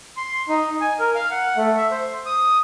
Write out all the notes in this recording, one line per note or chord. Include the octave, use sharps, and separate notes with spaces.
C6
D#4
G#5
A#4
F5
F#5
A3
E5
C5
D#6